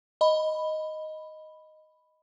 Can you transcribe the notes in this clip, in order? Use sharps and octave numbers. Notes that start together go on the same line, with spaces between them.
D#5 B5